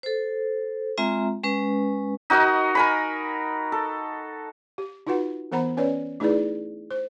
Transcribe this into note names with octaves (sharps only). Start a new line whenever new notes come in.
A4 C5
G#3 C4 F4 E5 A#5
G#3 C#4 B4
D#4 F#4 A#4 D#5
A#4 G#5 B5
A4
G4
D#4 F4 F#4 B4 F#5
E3 B3 C5 F#5 A#5 B5
C#4 B4 C#5 D5
A3 D#4 E4 G#4 B4 D5
C5